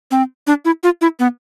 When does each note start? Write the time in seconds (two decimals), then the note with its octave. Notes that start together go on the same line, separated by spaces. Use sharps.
0.11 C4
0.47 D4
0.65 E4
0.83 F4
1.01 E4
1.19 B3